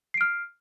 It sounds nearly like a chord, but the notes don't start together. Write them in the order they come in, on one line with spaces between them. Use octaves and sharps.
C7 D7 F6